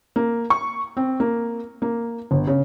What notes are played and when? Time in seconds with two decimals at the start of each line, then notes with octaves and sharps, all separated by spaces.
0.16 A#3
0.50 C#6
0.97 C4
1.20 A#3
1.82 A#3
2.31 G1
2.47 C#3